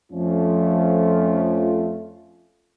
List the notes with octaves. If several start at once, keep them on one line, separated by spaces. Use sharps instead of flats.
F2 F3 A3 C#4 F4